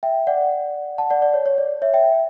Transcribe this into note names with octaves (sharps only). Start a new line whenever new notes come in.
E5 G5
D5 F#5
F#5 A5
D5 F#5
D5
C#5
C#5
D5
C#5 E5
E5 G5